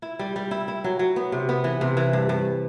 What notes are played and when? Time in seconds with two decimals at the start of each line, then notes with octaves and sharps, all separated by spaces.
0.02 E4
0.19 G3
0.36 G3
0.51 E4
0.68 E4
0.84 F#3
0.99 F#3
1.16 B3
1.32 C3
1.49 B3
1.64 E3
1.81 C3
1.97 E3
2.13 G2
2.29 G2